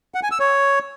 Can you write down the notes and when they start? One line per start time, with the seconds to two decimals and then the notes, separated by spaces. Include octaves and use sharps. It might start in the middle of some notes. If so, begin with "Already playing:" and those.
0.14 F#5
0.23 G#5
0.31 E6
0.40 C#5